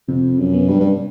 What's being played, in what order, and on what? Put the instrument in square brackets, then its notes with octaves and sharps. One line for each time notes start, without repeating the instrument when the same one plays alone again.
[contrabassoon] F2 [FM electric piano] C3
[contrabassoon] F#2
[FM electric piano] B3
[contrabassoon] G2
G2